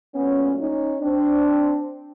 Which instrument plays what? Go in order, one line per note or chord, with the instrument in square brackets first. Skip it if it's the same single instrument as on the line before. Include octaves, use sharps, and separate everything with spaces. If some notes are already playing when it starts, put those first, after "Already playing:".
[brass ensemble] A#2 F#3 A3 B3 C#4
C#4 D#4
C4 D4